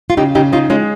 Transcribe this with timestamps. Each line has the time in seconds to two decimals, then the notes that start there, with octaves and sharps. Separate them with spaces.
0.10 F4
0.17 C#3 D#4 G4
0.35 C#3 D#4 G4
0.53 C#4 D#4 F4
0.70 G#3 C#4 F4